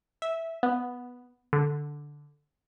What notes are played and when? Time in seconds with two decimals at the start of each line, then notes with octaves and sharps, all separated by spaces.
0.22 E5
0.63 B3
1.53 D3